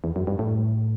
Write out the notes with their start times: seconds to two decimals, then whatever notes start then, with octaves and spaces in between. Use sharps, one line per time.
0.04 E2
0.16 F#2
0.27 G2
0.39 A2